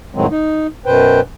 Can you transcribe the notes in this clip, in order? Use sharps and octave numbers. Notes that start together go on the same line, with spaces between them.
F2 A2 D#3 F#3 G#3 C4
D#4
F#2 B2 B4 C5 G5